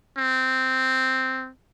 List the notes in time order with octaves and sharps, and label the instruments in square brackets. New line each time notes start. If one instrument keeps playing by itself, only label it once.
[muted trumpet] C4